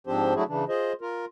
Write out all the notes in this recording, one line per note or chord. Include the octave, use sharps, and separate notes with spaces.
G#2 F3 C4 D4 G4 C5
F#3 A3 D4 E4 F#4 G#4
C#3 E3 D4
F4 G#4 C5 D#5
F4 A#4